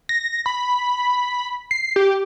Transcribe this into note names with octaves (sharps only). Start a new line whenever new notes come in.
A#6
B5
C7
G4